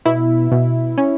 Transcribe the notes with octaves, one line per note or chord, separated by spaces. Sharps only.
B2 E4
B2
C#4